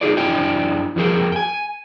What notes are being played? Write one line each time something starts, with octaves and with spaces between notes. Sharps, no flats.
D#4 F4 F#4 G#4 A4 D5
F#2 D4 E4 D5 G5 G#5
F2 F3 F#4 G#4 A#4 G5
G5 G#5